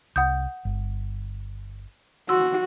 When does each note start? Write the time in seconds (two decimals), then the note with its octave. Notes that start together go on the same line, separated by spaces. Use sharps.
0.16 C2 F#5 D#6 G6
0.65 G1
2.29 F#4 C6 E6